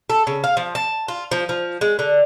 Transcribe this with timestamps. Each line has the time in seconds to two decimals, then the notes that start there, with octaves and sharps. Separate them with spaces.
0.10 A4
0.27 C#3
0.44 F5
0.57 F3
0.75 A5
1.08 F4
1.31 F3
1.49 F3
1.81 G#3
1.99 D3